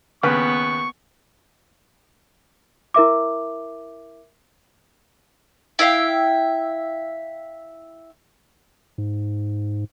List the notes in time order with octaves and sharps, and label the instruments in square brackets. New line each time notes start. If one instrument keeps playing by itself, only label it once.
[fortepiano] D#2 C#3 B4 [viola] B3 [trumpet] C#6
[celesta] E4 A#4 E5 D6
[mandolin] E4 E5 F5 G5
[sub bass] G#2